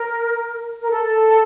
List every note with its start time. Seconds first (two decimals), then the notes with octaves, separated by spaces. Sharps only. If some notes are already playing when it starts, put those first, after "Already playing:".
Already playing: A#4
0.81 A#4
0.90 A4